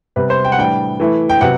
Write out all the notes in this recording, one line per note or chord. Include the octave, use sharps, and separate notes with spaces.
C3 G3 B3 B4
C5
G5
F#5
A2 E3 G3 D4 G5
E3 A3 E4
G5
C3 F#3 B3 F#5